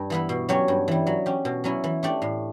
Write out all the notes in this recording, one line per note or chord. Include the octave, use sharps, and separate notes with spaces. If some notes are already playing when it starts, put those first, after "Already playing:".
Already playing: G2
E3 B3 E4 B4
B2
F#3 C#4 G4 C#5
G2
E3 G3
F#3
C#4 G4
B2
F#3 C#4 E4
E3
A3 D4 G4 D5
A2